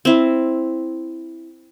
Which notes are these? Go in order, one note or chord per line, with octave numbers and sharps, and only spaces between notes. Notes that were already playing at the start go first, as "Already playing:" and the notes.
C4 E4